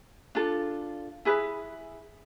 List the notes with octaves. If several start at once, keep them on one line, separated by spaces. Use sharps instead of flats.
D4 F4 A4
E4 G#4 B4